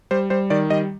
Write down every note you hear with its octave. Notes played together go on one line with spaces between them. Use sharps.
G3 C5
G3 C5
D#3 D5
G3 D#5